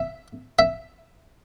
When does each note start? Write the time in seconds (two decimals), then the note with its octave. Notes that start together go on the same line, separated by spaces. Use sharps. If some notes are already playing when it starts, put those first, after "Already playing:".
Already playing: E5
0.59 E5